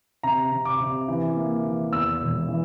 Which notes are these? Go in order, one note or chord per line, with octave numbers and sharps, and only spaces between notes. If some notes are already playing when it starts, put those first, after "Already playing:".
C3 A#5
C3
D6
C3
E3
A#3
E3
E2 E6
E1
E3